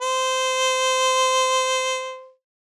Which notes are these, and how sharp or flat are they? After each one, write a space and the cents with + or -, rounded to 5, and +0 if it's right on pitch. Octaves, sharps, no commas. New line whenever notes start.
C5 -15